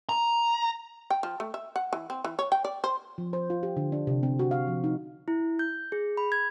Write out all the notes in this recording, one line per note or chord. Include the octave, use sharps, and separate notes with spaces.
A#5
G5
F3
A3
E5
F#5
E3
C4
E3
C#5
G5
D5
C5
F3
C5
F4
G4
D3
D4
C3
C4
F#4
F5
F3
D#4
E4
G6
G#4
B5
G#6